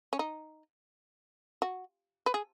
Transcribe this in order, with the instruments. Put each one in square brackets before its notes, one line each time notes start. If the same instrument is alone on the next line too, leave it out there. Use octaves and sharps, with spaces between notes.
[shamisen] C#4
D#4
F#4
B4
G#4